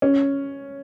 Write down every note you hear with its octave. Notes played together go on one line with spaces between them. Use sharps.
C#4